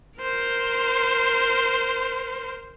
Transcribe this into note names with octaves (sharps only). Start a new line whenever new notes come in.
A#4 C5